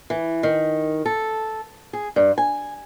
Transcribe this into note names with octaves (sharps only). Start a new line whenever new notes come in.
E3
D#3
A4
G#4
G2
G#5